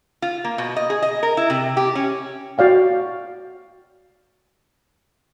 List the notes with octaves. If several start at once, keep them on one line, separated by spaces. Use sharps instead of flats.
F4
A#3
B2
D#5
G#4
D#5
A#4
E4
C3
G4
C#4
F#4 D5 F5 G5